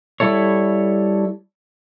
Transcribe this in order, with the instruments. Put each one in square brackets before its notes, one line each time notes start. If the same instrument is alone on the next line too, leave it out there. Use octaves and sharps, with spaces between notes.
[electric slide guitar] G3 E4 A4 C#5